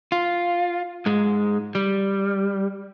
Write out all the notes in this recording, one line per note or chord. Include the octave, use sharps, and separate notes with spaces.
F4
G#2 G#3
G3